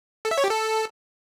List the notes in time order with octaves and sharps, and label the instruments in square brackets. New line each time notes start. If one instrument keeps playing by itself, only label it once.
[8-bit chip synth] A4
E5
C#5
G4
A4